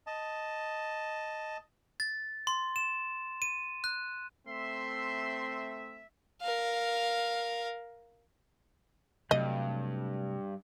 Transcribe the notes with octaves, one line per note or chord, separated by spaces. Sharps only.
D#5 A5
A6
C6
E7
D#7
F#6
A3 C4 E5 C6
A#4 F5
G2 C3 F#3 A3 D#5